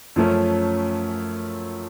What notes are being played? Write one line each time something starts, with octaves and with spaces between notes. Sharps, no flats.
F#2 F3 A3 C#4